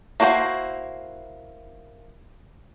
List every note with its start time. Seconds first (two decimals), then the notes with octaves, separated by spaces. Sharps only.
0.20 A#3 E4 F#4 A#4 C5